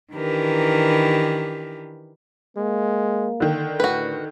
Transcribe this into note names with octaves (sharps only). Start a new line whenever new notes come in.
D#3 E3 D4 G4 A#4 B4
G#3 A#3
D3 D#3
A2 F#4 B4